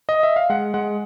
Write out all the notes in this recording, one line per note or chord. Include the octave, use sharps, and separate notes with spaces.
D#5
E5
F5
G#3 F#5
G#3 F#5